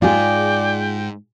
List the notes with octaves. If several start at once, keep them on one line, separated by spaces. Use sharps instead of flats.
G#2 F4 G#4 D5 G5